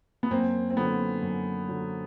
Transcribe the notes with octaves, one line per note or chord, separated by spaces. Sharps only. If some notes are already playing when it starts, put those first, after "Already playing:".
B3
F#2 A#3 C4
C4
D3 F#3 B3
F#2
D3 F#3